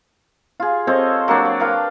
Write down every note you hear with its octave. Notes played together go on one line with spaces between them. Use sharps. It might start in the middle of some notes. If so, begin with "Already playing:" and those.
F4 G#4
C4 A4 C#5 D#5
F#3 A#3 D4
D5
A#4 B4 F5 G5